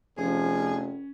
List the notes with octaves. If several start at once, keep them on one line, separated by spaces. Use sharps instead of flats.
F1 F3 C#4 G#4